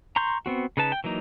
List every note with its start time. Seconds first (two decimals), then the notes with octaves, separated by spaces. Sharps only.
0.16 A#5 C6 C#6 G6
0.46 B3 C4 F#4
0.77 C#3 D#4 B4 A5
0.92 G5
1.04 E3 F#3 A#3 D#4